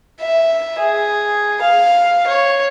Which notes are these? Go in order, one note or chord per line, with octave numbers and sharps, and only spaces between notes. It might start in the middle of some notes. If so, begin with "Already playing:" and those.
E5
G#4
F5
C#5